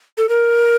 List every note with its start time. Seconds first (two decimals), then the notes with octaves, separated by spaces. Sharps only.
0.18 A4
0.29 A#4